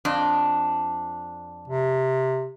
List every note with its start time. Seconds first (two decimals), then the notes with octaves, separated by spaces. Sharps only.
0.05 F2 D4 D#5
1.68 C3